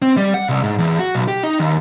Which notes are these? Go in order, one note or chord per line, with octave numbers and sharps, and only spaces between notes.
C4
G3
F#5
C2
G#2
E2
F#4
B1
G4
D#4
D#2